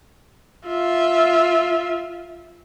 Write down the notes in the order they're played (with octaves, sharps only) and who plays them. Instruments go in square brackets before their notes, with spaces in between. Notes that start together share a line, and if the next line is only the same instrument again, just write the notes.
[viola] F4 E5